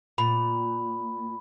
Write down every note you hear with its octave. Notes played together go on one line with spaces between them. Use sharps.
A#2 B5